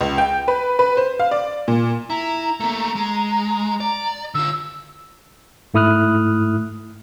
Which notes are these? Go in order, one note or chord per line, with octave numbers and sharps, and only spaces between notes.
C#2
G5
B4
B4
C5
F5
D5
A#2
E4 A#5
A3 A#3
G#3
D5
D3 F4 E6
G#2 A3 E4 D#6 F6 F#6